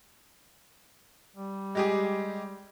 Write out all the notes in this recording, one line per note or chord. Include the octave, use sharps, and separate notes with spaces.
G3
G#3 G4 G#4